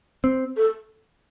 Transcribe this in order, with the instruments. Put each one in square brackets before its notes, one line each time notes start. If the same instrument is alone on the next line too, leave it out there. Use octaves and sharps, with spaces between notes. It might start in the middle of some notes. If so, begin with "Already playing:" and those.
[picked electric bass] C4
[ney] A4